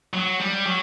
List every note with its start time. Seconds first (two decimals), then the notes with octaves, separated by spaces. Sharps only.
0.14 F#3
0.40 G3
0.66 F#3